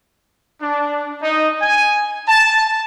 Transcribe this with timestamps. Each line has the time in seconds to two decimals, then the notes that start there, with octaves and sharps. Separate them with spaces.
0.61 D4
1.22 D#4
1.62 G#5
2.28 A5